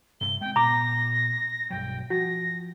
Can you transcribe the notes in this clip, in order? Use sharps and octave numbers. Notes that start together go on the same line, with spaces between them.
G2 C3 G7
G#3 C4 G5
A#2 B3 A#5 D6 A#6
B1 G2 F#3 G5
F3 F#4 A#6